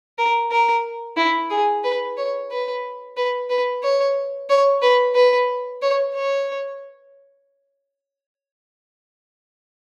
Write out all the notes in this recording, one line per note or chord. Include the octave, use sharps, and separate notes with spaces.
A#4
A#4
E4
G#4
B4
C#5
B4
B4
B4
C#5
C#5
B4
B4
C#5
C#5